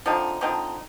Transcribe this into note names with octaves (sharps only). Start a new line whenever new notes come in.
D3 F3 C4 D#4
D3 F3 C4 D#4